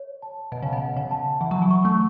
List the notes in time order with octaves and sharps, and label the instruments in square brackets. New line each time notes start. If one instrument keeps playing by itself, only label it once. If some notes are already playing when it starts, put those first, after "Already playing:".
Already playing: [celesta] C#5
A5
[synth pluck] B2 [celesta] A5
[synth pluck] C#3
B2
[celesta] F#5
[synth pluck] C#3
[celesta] A5
[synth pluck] E3 [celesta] F#5
[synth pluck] F#3
E3
[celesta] C#6
[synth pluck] A3